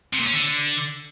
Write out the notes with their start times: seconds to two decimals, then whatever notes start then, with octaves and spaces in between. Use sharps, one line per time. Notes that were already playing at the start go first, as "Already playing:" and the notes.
0.13 C3
0.20 A#2
0.26 C#4
0.33 D3